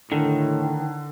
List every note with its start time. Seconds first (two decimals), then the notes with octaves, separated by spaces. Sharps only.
0.12 A2 D3 D#3